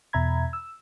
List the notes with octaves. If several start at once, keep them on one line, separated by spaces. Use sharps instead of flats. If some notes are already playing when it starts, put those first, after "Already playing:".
E2 B2 E5 A#5 B5 G#6
E6